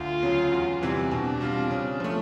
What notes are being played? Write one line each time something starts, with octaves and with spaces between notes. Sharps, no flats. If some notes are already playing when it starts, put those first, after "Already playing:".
Already playing: D2 F4
C#3 F#3
E2
C3 E3 G3 C4
B2 D4
G3 C4 F4
C#3
F3 A3